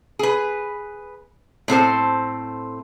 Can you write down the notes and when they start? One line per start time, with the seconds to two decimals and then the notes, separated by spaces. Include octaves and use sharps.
0.19 G#4 B4
1.68 A2 C4 A4 C5